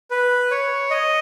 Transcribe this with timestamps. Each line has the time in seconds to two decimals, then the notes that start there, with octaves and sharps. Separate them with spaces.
0.11 B4
0.51 C#5
0.90 D#5